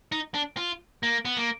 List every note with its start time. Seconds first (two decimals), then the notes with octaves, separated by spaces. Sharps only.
0.12 D#4
0.34 D4
0.57 F4
1.03 A#3
1.25 B3
1.37 A#3